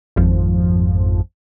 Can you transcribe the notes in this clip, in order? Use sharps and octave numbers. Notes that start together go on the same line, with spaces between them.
G#1 F2 F3